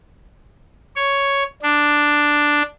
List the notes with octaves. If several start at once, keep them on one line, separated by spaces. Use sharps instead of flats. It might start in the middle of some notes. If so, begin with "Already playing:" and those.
C#5
D4